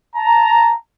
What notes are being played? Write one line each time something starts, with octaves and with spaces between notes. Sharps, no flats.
A5 A#5